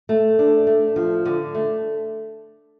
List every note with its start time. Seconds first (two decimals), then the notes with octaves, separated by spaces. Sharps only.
0.09 A3
0.39 D4
0.67 A3
0.96 F3
1.25 D3
1.55 A3